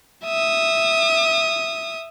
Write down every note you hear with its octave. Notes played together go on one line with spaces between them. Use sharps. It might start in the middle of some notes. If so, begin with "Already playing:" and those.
E5 D#6